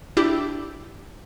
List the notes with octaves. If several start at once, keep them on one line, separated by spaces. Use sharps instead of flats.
D4 E4 G4